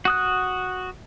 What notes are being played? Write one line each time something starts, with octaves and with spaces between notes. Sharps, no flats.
F#4 D#6 F#6